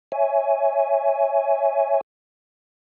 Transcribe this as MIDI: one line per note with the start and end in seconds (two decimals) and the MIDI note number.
0.12 2.01 73
0.12 2.01 76
0.12 2.01 80